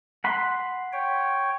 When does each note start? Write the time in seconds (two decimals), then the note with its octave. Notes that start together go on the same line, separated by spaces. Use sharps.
0.24 F#5 B5 C6
0.93 C#5 G5